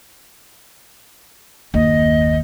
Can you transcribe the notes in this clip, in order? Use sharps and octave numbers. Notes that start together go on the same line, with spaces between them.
F#1 D#2 D#5